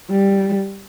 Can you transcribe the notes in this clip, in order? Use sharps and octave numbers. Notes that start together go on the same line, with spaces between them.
G3